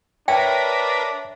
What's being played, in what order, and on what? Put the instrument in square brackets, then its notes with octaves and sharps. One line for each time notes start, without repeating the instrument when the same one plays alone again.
[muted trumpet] D4 [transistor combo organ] A#4 B4 [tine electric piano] C#5 E5 A5 [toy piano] G5